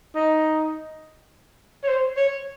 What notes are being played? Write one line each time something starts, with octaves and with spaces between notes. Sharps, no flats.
D#4
C#5
C5
C#5